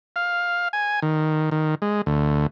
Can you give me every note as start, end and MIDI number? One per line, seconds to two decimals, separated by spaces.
0.16 0.68 77
0.73 1.00 80
1.02 1.50 51
1.51 1.75 51
1.82 2.01 56
2.06 2.46 38